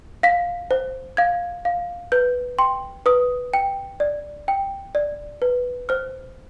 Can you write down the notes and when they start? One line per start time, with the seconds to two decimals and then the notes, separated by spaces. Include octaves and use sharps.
0.23 F5 B6
0.71 C5
1.17 F5 G#6
1.65 F5
2.12 B4 G6
2.59 G5 C6
3.06 B4 D#6
3.54 G5
4.00 D5
4.48 G5
4.95 D5
5.42 B4
5.89 C5 F6